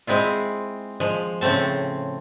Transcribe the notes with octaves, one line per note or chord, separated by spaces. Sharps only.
G#3 C4 E4 F4
F3 G#3
A2 C#3 A3 C4 A5